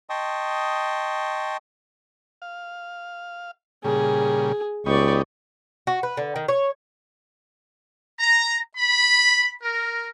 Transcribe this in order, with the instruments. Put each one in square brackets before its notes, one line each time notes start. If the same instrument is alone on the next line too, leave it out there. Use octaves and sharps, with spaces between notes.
[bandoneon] D#5 G5 A5 C6 C#6 D#6
[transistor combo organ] F5
[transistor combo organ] A#2 C#3 G3 [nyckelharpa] G#4
[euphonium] C#2 [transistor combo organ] B3 D#4 G4 [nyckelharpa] D5 C#6
[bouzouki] F#4
B4
D3
D#3
C#5
[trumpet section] A#5
B5
A#4